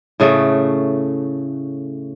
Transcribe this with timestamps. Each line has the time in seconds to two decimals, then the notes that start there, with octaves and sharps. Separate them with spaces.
0.20 A2 C#3 A3